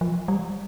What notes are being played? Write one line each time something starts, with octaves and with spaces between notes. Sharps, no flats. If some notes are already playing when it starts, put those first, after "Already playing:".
F3
G3